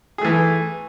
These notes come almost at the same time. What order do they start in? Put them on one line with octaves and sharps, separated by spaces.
G#4 A3 E3